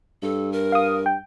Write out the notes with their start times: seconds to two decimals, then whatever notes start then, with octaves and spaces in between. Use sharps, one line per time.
0.23 G2 A4
0.52 A#4
0.72 F5 D#6
1.06 G5